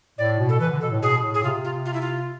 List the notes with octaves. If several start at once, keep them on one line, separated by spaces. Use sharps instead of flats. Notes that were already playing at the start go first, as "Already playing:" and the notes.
A2 D5
B2
A4
E3 B4
D3
B2 A4
A2
B2 G#4
A2
G#4
C3 F4
F4
F4
E4
F4